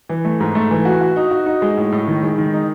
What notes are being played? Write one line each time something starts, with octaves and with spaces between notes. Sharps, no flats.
E3
A3
G#2
A3
E3
F#4
F#4
D#4
F#4
D#4
G#3
A2
A2
D#3
G#3
D#3
D#4